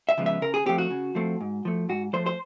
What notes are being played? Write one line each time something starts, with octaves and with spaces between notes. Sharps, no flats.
E5
C#3 F3 G#3 B3
E5
C#3 A#4
G#4
F3 A3 C4 G4
F#4
C#3
F3 A3 C4
G#2
F3 A3
G#2 F#4
F3 A3 C5
C5